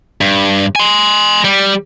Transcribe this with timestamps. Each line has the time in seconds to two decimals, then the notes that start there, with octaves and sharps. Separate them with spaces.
0.21 G2
0.76 G#5 C6
1.44 G3